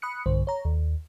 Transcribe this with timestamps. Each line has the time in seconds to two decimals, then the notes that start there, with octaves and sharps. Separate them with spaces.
0.02 B5 D#6 F#6 C#7
0.26 B1 G2 D3 C5
0.47 C#5 A#5
0.65 D#2